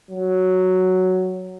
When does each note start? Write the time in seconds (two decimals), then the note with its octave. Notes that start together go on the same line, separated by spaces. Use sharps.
0.11 F#3